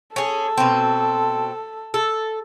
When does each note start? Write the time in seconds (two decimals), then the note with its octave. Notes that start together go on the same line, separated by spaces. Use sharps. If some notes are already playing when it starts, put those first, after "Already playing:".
0.16 C#4 G#4 A4
0.58 B2 C4
1.94 A4